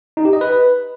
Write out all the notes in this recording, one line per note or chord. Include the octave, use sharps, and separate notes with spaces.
D#4
G4
D#5
B4